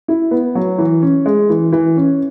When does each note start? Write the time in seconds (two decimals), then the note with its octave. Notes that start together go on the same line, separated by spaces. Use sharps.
0.08 E4
0.31 B3
0.55 F#3
0.78 E3
1.02 C#4
1.26 G#3
1.50 E3
1.72 E3
1.97 C#4